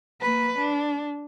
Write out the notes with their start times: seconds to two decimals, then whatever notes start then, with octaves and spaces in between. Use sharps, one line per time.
0.21 A#3 B4
0.58 D4